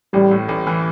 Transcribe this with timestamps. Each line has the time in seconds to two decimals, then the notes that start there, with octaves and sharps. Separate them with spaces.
0.13 A1 G3
0.31 A2
0.48 A1
0.67 E3